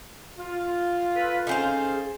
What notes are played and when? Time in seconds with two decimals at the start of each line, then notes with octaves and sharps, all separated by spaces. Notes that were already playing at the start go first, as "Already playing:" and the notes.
0.38 F4
1.14 A4 B4
1.47 C#4 D#4 G#4 A4 C5 F5